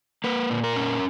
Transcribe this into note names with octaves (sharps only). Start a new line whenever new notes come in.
A#3 B4
A#2
A#4
C#4